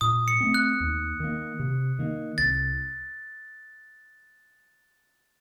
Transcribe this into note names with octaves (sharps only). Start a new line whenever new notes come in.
A#2 D#6
C#7
A3 C4
F#6
D#2
D#3 A#3
C3
D#3 A#3
C2 A6